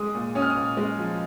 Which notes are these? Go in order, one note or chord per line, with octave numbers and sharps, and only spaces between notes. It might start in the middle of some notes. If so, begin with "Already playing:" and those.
Already playing: G#3 D#6
A#2
C#4 D#6
F6
D#6
A#2
G#3
F3